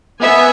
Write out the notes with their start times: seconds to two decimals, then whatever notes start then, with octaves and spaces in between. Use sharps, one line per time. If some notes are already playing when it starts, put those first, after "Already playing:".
0.21 B3 E5 G#5